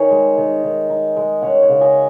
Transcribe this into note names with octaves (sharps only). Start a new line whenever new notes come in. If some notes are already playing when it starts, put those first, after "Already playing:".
Already playing: D#3 G#4 C#5
G#3
D#3
D#3
D#4
G#3
C#4 C#5 F#5
C#5 F#5
C#3
D#5 G#5